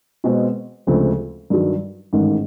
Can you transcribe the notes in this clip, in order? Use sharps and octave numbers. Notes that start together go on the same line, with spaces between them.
B2 G#3 C4
D2 C#3 F3 G#3 C4
G2 D#3 F#3
A1 G#2 D#3